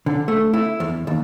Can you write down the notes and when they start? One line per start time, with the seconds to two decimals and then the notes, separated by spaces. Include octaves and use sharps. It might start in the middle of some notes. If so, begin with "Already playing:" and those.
0.06 D3
0.28 A3
0.53 E4
0.80 E2
1.07 D#2